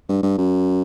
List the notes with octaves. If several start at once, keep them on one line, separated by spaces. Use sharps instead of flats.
G2
G2
F#2